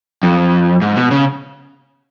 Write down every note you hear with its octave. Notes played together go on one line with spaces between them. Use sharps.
F2
G#2
B2
C#3